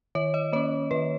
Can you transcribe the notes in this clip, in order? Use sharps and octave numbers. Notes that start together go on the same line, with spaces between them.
D#3 C#5
D#5
A#3 C#4 C#5
D#3 B4